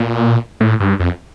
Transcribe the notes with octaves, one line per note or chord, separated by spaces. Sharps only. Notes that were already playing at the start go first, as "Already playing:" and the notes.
Already playing: A#2
A2
G2
F2